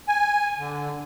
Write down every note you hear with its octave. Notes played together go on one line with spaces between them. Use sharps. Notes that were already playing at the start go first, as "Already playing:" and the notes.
G#5
D3